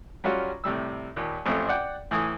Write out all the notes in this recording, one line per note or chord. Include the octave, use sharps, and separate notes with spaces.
F#3 G3 C#4 F4 F#4
A2 C3 G3 E6
D#2 A#2
A1 F2 A3 C4
D5 F#5 G5
A2 E3 G#5 D#6